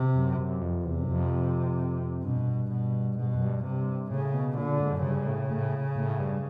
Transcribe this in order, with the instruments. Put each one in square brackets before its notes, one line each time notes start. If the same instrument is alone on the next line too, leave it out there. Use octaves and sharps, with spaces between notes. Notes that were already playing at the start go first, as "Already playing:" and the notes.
Already playing: [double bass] C3
[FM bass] F#2
F#2
F2
[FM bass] E2 [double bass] C3
[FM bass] F#2
F2
[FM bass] G2 [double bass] B2
[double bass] B2
[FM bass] G#2 [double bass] B2
[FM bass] G2
F#2
G2
[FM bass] G2 [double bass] C3
[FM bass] A2 [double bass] C#3
[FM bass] B2
[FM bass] A#2 [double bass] D3
[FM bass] G#2
F#2
[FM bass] G2 [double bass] C#3
[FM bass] A2
A2
A2
G2